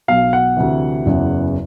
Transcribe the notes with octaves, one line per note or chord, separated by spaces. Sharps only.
B1 B2 F5
F#5
D2 C3 E3
F#1 E2 C#3 E3